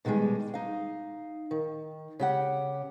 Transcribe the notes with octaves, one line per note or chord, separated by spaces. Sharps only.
B2 D3 D#3 G3 G#3
D#4 F5
D#3
C#3 G4 F#5